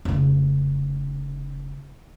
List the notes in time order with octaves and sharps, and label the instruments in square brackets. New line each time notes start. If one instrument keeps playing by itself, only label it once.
[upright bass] F1 C#3